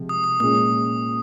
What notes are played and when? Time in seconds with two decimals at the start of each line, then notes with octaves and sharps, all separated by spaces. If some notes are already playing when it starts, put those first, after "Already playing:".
Already playing: C3 F3 G#3
0.09 D#6
0.24 D#6
0.40 A#2 G#3 C#4 D#6